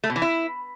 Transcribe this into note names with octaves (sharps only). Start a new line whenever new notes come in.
A3
B2
E3
E4